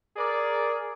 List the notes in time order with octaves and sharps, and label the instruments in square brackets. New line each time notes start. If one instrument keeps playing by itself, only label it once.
[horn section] G#4 A#4 D5